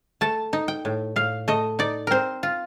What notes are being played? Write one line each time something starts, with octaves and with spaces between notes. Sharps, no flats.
A3 A5
D#4
G5
A2
A2 F5
A3 D#5
D#4 D5
C4 A#4 C5
F4